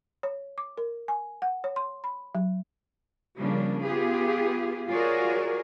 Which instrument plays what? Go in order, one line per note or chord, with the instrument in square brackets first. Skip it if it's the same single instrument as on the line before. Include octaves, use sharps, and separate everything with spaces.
[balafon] C#5
D6
A#4
G#5
F#5
C#5
C6
B5
F#3
[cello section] C#3 F3 G3 A#3 D4
B3 F4 G4 G#4
F4 F#4 G#4 A#4 C#5 D5